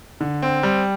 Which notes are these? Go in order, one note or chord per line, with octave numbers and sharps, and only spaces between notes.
D3
C4
G3